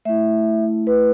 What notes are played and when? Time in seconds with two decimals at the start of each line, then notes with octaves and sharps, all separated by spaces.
0.05 A3 E4 E5
0.87 B4